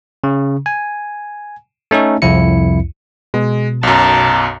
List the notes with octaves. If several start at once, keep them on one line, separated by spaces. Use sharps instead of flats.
C#3
G#5
A3 C#4 D#4 A4
C2 F2 E4 C#7
B2 G#3
B1 F#2 A5 A#5